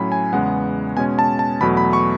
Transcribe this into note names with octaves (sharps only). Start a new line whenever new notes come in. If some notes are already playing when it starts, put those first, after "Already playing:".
Already playing: A2 F#3 C#4 B5
G#5
E2 C#3 G#3 B3 F#5
B2 G#3 C#4 G#5
A5
A5
E2 B2 F#3 A3 B5
B5
C#6